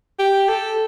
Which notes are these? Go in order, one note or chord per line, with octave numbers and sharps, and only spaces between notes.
G4
A4